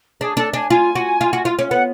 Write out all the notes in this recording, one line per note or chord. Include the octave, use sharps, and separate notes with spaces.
D4 G#4
D4 A4
D4 G#5
F4 G#5
F#4
F4
F#4
F4
C#4
B3 F#5